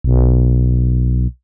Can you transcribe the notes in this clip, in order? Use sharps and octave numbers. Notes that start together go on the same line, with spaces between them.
B1